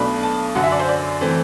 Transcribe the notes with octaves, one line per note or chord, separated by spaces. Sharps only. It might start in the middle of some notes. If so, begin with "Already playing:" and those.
Already playing: B1 B2 A3 D4 B5
A5
F#2 D3 F#3 F#5
E5
D5
C5
D5
E3 A3 C4